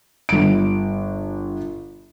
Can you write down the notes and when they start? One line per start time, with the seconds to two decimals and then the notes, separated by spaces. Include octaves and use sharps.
0.29 G1 D7